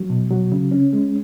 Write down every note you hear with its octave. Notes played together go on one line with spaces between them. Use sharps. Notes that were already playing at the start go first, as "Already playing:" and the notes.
Already playing: F#3
B2
F#3
C#3
C#4
G#3